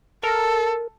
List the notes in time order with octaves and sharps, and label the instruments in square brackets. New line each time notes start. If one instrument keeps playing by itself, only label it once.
[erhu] A4 [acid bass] A#4